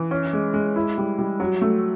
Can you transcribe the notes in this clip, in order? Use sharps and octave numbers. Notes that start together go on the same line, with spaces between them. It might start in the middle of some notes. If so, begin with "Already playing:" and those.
Already playing: E3
C#4
G#3
G#3
E4
G3
G3
F#3
A3